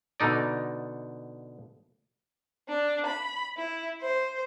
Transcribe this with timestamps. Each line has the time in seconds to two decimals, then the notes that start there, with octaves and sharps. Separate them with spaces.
0.20 B2 D3 D#4 D5
2.69 D4
3.06 B5
3.58 E4
4.01 C5